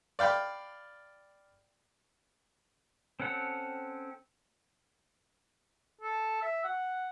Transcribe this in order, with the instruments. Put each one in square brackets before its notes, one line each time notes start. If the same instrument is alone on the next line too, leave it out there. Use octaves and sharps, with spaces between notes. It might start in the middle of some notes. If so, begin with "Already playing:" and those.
[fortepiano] D5 F5 G5 B5 D6
[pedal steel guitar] C4 C#4 A4 F#5
[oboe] A4
E5
F#5